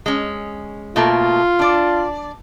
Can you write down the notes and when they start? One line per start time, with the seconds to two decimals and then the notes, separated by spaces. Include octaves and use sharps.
0.06 G#3 C#4
0.96 B2 A3 A#3 F4
1.59 D4 D5